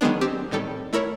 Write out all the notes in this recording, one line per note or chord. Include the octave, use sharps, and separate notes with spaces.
D#3 F#3 G#3 B3 D4
C4 G4
A2 D#3 G3 A4
A3 E4 A#4 C#5